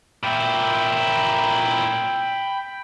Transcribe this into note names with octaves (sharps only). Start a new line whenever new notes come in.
A#2 E4 G5 B5